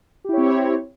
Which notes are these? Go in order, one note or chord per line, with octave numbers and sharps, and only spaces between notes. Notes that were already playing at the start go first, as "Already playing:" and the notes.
C4 E4 G4 C#5